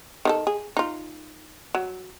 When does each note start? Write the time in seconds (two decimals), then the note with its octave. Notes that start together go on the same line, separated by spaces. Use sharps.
0.25 D#3 D#4 A4
0.47 G#4
0.77 D#4 F4
1.75 F#3